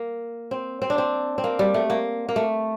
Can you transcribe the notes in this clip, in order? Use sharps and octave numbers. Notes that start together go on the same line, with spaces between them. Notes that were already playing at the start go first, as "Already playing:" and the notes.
Already playing: A#3
C4
C4
D4
C4
C4
A#3
G3
A3
A#3
A#3
A3